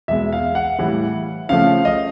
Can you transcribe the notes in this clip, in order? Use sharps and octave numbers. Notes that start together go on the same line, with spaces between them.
E2 B2 G#3 B3 E5
F5
F#5
A2 E3 G3
C#3 F3 A3 F5
D#5